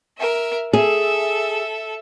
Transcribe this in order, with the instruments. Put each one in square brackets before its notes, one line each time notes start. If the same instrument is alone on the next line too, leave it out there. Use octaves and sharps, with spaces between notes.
[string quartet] A#4 E5
[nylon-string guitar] G#4 [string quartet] A4 E5